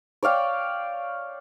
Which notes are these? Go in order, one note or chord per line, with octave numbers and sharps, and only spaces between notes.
C#5 D5 F5 G5